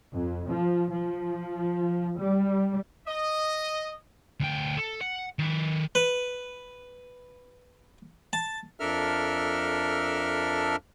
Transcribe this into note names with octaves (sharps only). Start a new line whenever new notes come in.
F2
F3
F3
G3
D#5
D2 G5
A4
F#5
D#3 B4
B4
A5
F2 D4 A4 A#4 E5 F6